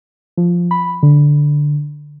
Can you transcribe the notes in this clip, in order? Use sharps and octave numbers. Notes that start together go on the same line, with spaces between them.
F3
B5
D3